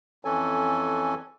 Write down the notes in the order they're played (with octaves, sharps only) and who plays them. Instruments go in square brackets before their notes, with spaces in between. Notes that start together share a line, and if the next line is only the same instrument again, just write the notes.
[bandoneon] F2 E3 C#4 A4 G#5